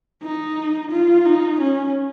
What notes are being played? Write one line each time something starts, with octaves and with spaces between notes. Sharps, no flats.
D#4
F4
D#4
C#4